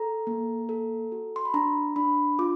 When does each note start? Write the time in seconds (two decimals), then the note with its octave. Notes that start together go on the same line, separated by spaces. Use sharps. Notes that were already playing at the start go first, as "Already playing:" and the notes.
Already playing: A4 A#5
0.27 A#3
0.69 A4
1.12 F#4
1.36 C6
1.45 B5
1.54 D4 A#5
1.96 D4 B5
2.39 F4 D6